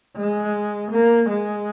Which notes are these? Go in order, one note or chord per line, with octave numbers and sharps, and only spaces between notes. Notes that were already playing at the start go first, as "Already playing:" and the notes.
G#3
A#3
G#3